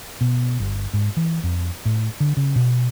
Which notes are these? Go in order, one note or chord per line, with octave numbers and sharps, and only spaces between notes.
B2
G1
G#2
E3
F2
A2
D3
C#3
B2